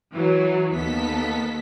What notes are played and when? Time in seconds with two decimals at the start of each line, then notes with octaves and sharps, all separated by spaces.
0.13 E3 F#3
0.72 D#2 B3 A4 B6